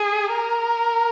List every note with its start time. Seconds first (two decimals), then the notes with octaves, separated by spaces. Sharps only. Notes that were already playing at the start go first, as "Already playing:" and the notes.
Already playing: G#4
0.33 A#4